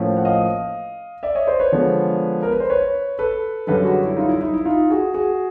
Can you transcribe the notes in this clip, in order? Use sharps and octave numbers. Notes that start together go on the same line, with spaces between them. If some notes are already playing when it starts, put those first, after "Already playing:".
Already playing: A2 F3 A#3 C#4
F#5
D#5 F5
D5 E5
C#5 D#5
C5 D5
B4 C#5
D3 F3 G#3 B3
A#4
B4
C5
B4 C#5
A4 B4
F#2 D3 G3 A4 B4
F#4 G#4
E4
D#4 F4
E4
D#4
E4
D#4 F4
F#4 G#4
F#4 G#4